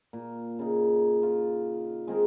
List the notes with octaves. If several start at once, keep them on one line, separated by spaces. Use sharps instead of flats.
A#2
C#3 D#4
F4
G#3 C4 G#4 A#4